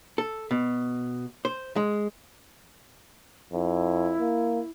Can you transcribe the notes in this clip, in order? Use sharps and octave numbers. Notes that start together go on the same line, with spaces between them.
A4
B2
C5
G#3
F2 E4
A#3